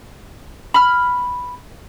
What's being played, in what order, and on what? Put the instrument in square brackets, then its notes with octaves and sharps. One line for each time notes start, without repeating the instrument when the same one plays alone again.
[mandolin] B5 F6